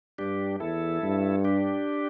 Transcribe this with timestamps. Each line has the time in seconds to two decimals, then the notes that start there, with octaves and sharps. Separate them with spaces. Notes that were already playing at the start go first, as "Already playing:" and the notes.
0.18 G2 D4 G4
0.60 E2 E4 A4
1.03 G2
1.44 D4 G4